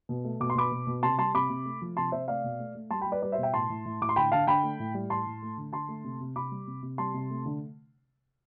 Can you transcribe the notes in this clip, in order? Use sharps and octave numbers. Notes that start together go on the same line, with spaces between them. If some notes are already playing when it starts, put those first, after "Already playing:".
B2
A3
B2 D6
C6
B2 B5 D6
B2
B2
C3 A5 C6
G3 A5 C6
C3 B5 D6
C3
A3
F3
C3 A5 C6
C3 C5 E5
A3 D5 F5
B2
A3
A3
G3 A5 C6
G5 B5
G3
B4 D5
G3 B4 D5
C5 E5
B2
E5 G5
A2 A5 C6
A2
A2
A2 D6
C6
D3 G5 B5
D3 F5 A5
D3 G5 B5
A3
A2
G3
A2 A5 C6
A2
A3
D3
D3 A5 C6
A3
C3
C3
C3 B5 D6
G3
C3
C3
G3 A5 C6
C3
A3
D3